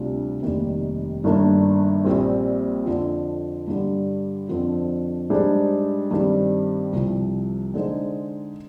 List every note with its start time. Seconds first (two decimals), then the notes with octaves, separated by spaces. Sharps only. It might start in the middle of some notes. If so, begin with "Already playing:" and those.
Already playing: D2 C3 G3 D4 F4
0.42 F1 D#2 D#3 G3
1.24 G1 G2 D#3 A#3 D4
2.05 A#1 A#2 G3 C4
2.86 F2 D3 F3
3.68 G2 D3 G3
4.49 F2 D3 F3 C4
5.30 G#2 G3 D4 G#4 C5
6.11 G2 D#3 G3 C4
6.93 C2 C3 F3
7.74 D3 G#3 D#4 G#4 C5